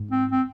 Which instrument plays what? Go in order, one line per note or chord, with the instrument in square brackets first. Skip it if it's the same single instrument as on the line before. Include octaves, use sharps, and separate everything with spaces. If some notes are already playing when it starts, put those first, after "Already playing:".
Already playing: [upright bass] G#2
[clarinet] C4
C4